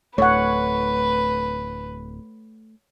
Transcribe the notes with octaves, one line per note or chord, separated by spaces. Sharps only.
D1 A3 B4 C#5 F#5